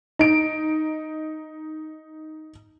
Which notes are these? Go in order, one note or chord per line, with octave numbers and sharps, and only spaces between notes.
D#4 D7